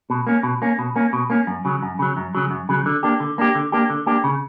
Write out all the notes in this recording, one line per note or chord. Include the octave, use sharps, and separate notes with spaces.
B2
A#3 C#4
B2
A#3 C#4
B2
A#3 C#4
B2
A#3 C#4
F#2
C#3 F#3
F#2
C#3 F#3
F#2
C#3 F#3
F#2
C#3 F#3
D3
A#3 D4 G4
D3
A#3 D4 G4
D3
A#3 D4 G4
D3
A#3 D4 G4
C#3